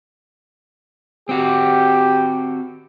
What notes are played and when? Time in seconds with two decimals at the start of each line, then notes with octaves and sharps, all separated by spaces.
1.29 C4 F#4 G4